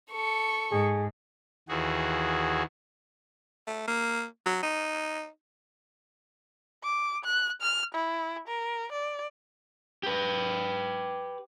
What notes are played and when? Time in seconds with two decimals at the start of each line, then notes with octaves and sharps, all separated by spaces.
0.12 A4 C#6
0.71 G#2 G#4
1.69 D#2 E3 F#4 G#4
3.67 A3
3.87 A#3
4.46 F#3
4.62 D#4
6.83 D6
7.24 F#6
7.61 F6
7.94 E4
8.47 A#4
8.92 D5
10.03 G4 B4